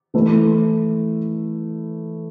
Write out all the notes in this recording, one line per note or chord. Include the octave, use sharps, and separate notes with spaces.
E3 A3 E4 B4